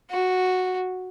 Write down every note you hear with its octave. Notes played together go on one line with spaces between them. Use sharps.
F#4